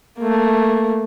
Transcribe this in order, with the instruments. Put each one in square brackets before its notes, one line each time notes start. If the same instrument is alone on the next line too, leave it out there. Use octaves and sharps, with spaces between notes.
[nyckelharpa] A3 A#3